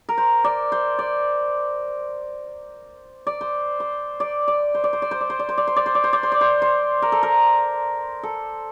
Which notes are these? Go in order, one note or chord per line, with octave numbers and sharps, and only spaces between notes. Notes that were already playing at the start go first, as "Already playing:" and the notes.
A#4
C5
D5
C5
D5
D5
C5
C5
D5
D5
C5
D5
C5
D5
C5
D5
C5
D5
C5
D5
C5
D5
C5
D5
C5
D5
C5
D5
C5
C5
A#4
A4
A#4
A4